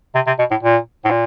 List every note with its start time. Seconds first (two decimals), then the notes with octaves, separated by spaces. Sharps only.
0.15 C3
0.27 C3
0.39 B2
0.51 A2
0.63 A#2
1.05 A2
1.10 A#2